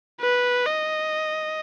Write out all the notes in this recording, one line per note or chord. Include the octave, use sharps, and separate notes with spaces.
B4
D#5